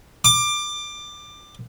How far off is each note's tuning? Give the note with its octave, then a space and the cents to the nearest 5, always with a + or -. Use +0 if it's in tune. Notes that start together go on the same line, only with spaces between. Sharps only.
D6 +20